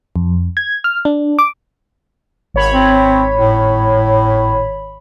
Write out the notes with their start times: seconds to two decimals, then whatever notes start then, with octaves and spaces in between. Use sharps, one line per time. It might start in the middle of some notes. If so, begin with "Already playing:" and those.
0.16 F2
0.57 G#6
0.84 F6
1.05 D4
1.39 D6
2.54 G#1 C#5 B5
2.72 C4
3.37 A2